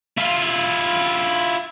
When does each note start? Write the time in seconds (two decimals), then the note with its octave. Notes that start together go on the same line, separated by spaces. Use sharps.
0.17 E4 F4